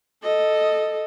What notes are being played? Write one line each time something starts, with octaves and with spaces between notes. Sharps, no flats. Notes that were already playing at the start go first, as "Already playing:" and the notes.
A4 D#5